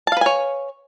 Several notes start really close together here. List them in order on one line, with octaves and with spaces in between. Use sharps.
A5 F5 B4 G#5 C#5